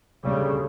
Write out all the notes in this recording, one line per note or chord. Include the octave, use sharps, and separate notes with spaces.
D2 C#3 G3